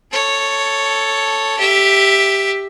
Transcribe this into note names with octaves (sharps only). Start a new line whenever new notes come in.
A4 C#5
G4 E5